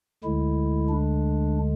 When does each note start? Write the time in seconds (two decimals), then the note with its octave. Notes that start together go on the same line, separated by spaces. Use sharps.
0.24 D2 D3 G#3 E4
0.89 D4